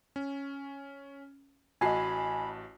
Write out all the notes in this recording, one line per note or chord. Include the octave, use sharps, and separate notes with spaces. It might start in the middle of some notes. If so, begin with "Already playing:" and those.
C#4
A1 F#4 D#5 G#5 A5 B5 C7